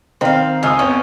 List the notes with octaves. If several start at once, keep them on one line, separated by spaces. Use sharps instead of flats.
D#3 C4 F5
C#2 F4 G#5 C#6 D#6 E6
F2 B3 C#4